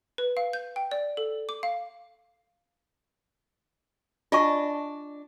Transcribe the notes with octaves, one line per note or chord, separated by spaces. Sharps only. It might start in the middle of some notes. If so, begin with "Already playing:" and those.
B4
F5
G6
G5
D5
A4
D6
F5
D4 F4 D#5 G#5 C#6